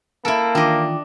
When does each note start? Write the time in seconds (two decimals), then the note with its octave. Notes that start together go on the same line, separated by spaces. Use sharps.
0.25 A#3 E4 A4 A5 D7
0.55 D#3 E3 D4 F4 D#5 G5 D6